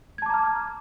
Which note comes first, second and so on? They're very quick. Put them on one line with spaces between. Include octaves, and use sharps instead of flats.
G#6 A5 D6 A#5 F6